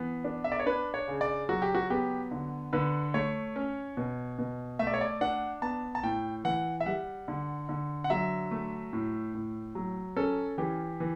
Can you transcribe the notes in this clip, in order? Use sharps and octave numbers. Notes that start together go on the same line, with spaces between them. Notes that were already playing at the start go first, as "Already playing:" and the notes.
Already playing: E3 B3
D4
E5
D5
C#5
D4 B4
C#5
C#3
D5
F#3 F#4
G4
F#4
B3 G4
D3
D3 B4
A3 C#5
C#4
B2
B2
A3 E5
D5
C#5
D5
D4 F#5
B3 A5
A5
A2 G5
E3 F#5
E5
G3 F#5
D3
D3
F#5
F#3 E5
A3
A2
A2
F#3
C#4 A4
E3 G4
E3